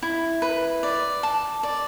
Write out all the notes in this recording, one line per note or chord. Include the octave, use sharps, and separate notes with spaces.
E4
B4
D5
A5
D5